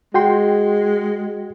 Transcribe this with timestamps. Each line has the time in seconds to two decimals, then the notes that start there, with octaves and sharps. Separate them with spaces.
0.14 G#3 F#4 G5 C6